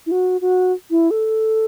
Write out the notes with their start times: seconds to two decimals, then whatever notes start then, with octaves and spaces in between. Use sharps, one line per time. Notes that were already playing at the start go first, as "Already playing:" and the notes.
0.06 E4
0.11 F#4
0.41 F#4
0.91 E4
1.11 A4